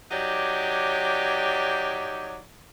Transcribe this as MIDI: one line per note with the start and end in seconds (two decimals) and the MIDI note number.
0.11 2.38 54
0.11 2.38 63
0.11 2.38 67
0.11 2.38 73
0.11 2.38 74